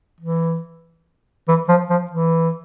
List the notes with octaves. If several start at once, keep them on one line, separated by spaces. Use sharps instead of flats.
E3
E3
F3
F3
E3